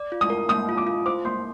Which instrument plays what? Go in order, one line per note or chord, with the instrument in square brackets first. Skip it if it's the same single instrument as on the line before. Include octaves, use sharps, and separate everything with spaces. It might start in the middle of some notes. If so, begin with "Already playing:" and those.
Already playing: [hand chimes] D5
F4
[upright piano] D#6
[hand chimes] A#4
[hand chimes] A#3 [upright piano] D#6
[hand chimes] F4
[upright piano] D6
[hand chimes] F4
[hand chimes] C5 [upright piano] D6
[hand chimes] A#3 [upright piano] C6